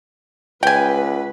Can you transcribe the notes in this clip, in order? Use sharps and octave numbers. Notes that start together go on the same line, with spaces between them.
C#2 B4 G5 G#5